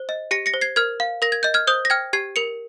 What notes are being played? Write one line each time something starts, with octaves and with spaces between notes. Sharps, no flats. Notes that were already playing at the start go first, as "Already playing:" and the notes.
Already playing: C5
D#5
G4 A#6 C#7
A#6 C#7
C5
G#6 C7
A#4 F6 G#6
F5
A#4 A#6
G#6
D#5 G6
F6 G#6
C5 D#6 G6
A#6
G5 F6 G#6
G4 G#6 C7
A#4 C#7 F7